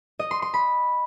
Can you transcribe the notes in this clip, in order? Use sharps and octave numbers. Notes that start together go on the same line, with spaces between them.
D#5
C6
C6
B5